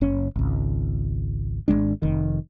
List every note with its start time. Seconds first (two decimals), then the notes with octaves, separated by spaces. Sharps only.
0.01 F#1 C#4
0.36 G#1 C#2
1.68 G#1 F#2 G#3 D4
2.02 F1 D#3